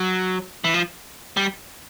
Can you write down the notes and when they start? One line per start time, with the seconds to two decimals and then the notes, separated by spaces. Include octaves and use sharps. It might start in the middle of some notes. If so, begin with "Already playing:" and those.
Already playing: F#3
0.64 E3
0.74 F3
1.37 G3